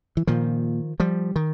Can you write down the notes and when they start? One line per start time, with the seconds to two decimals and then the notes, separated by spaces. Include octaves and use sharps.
0.17 E3
0.27 A#2 D#3 F3
1.00 F3 G3
1.36 D#3